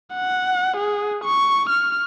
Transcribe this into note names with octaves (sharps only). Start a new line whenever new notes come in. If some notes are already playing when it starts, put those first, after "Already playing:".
F#5
G#4
C#6
F6